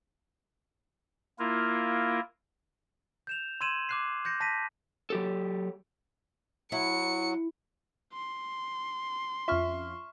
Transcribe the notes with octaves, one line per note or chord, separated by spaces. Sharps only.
A#3 E4 F4 A#4
G6 E7 F7
C6 E6 G#6 D#7 E7 F#7
D6 F#6 C7
F#6 G6 A#6 C#7
A5 A#6 B6 D#7
F#3 G4 A4
F#3 E4 C#7
C6
F2 C#4 F4 E5 C#6 F6